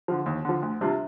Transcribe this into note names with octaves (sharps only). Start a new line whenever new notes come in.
D3 F3
D#2
D3 F3
D2
C3 G3 D4 F4